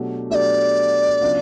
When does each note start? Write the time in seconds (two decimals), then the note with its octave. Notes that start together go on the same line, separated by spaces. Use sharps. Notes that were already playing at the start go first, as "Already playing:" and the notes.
Already playing: B2 F#3 A3 D4 G4
0.30 B2 F#3 A3 D4 G4 D5 E5
1.21 C#3 F#3 B3 D4 F4